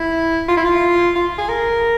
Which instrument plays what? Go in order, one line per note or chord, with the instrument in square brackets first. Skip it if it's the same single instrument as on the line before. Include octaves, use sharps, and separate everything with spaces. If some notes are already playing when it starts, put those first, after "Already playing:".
Already playing: [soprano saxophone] E4
F4
E4
F4
F4
G#4
A#4